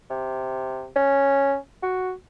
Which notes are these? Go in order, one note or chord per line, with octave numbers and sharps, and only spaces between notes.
C3
C#4
F#4